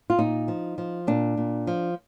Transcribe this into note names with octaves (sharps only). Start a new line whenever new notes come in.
F4
A#2 D#4
F3
F3
A#2 D4
A#2
F3